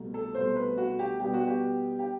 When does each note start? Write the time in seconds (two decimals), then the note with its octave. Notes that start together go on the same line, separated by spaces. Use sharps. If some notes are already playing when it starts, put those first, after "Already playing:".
Already playing: C2 B2 A3
0.14 A4
0.35 C2 B2 A3 C5
0.56 B4
0.78 F#4
0.99 G4
1.20 B2 G3 B3 G4
1.34 F#4
1.47 G4
1.99 G4